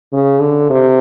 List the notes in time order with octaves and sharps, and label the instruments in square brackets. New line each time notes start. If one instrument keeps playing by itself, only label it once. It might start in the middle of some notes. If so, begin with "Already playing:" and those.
[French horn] C#3
D3
C3